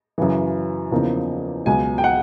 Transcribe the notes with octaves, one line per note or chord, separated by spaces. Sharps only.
F#2 C#3 E3
E2 C#3 F3 A#3 D#4
C#2 B2 F#3 G#5
G5
F#5